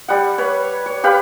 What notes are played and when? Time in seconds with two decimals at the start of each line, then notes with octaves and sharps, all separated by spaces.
0.08 G3 F#5
0.38 B4 C#5
0.86 C#5
1.04 G4 B4 F5 B5